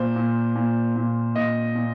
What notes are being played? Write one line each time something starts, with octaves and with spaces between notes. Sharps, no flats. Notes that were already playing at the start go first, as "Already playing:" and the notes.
Already playing: A#2 C5
A#2
A#2
A#2
A#2 D#5
A#2